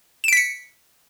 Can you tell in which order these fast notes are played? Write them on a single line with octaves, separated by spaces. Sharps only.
E7 D7 B6 C#7